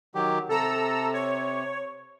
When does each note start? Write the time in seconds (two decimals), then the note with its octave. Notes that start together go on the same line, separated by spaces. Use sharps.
0.15 D#3 F#3 G4
0.49 C3 A4 A#5 E6
1.13 C#5